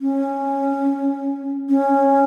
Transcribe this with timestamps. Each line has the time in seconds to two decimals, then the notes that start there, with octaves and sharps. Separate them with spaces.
0.01 C#4
1.69 C#4